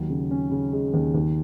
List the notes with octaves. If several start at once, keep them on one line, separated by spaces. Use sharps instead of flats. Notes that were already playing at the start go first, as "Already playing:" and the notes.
Already playing: D#2 F#3
C#3
C#4
C#3
G#3
D#2
D#2